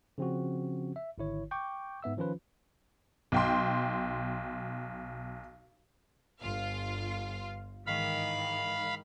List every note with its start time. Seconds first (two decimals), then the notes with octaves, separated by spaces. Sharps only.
0.18 C#3 F3 C4 C#4 F#4
0.96 E5
1.18 G#1 D3 E4 C#5
1.51 G5 C#6 D6 G6
2.03 G#2 B3 E5 E6
2.17 D#3 F3 C#4 F4 B4
3.32 B1 G5 C6
6.42 G1 F4 F5
7.86 G#2 D#3 E3 F5 B5